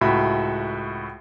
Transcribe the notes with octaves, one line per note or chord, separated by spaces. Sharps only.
C#2 A2 F#4 E5 B5